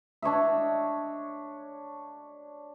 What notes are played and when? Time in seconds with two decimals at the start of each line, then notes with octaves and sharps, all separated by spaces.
0.22 D4 C#5 D#5 E5